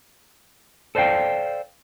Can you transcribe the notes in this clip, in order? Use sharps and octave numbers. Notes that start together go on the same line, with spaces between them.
A4 C5 D5 F5 G5